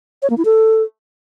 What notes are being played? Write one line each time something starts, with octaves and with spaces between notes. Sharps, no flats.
C#5
A#3
E4
A4